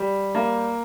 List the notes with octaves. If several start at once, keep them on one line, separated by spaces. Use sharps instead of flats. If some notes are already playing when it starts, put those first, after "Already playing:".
Already playing: G3
A#3